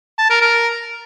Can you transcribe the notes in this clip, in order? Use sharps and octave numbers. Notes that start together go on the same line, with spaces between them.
A5
A#4
A#4